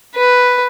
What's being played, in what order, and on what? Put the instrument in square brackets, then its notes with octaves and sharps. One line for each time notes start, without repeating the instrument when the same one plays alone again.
[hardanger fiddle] B4